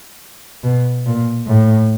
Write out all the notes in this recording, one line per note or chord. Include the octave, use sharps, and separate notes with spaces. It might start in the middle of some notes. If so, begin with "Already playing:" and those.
B2
A#2
A2